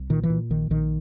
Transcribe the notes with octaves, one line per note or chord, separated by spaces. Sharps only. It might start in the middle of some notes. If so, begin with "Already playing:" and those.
Already playing: C2
A#2 D#3
E3
A#2
A#1 D#3
A#1 D#3